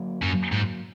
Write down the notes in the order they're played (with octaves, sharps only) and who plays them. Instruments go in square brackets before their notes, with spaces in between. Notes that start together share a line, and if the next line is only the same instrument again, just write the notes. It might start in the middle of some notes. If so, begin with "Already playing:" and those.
Already playing: [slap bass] D3 F#3 A#3
[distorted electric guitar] F#2
G#2